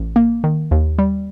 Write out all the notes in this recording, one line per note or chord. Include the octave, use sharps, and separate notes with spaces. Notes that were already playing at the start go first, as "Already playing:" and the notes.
Already playing: A1
A#3
D#3
D#2
G3